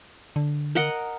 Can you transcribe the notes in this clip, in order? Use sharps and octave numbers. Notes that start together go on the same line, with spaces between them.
D3
A#4 D#5 F#5